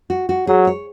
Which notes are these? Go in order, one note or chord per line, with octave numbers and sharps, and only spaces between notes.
F#4
F#4
F#3 G#4
C#5